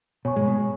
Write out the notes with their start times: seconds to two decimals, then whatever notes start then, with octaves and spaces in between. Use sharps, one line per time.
0.25 B2 C#5 G#5 C#6
0.36 G#2 G#3
0.48 B2